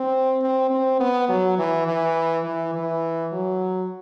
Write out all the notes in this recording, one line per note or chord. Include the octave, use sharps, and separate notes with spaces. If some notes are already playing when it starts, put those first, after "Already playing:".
Already playing: C4
C4
C4
B3
F#3
E3
E3
E3
E3
F#3